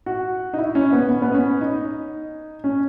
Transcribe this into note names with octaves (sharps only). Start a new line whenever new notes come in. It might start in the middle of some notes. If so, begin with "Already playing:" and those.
F#4
D#4
E4
C#4
B3
C#4
B3
C#4
D#4
C#4